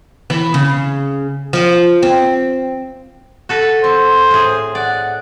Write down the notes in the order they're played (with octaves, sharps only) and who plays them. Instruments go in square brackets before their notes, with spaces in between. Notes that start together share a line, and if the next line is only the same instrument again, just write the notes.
[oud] E3
C#3
F3
C4
[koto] F#4 A4 B4
[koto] C4 [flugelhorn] C5
[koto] A2 G#4
[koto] D5 [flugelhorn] F#5